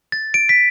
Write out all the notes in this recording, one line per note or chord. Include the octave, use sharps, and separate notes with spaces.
A6
D7
B6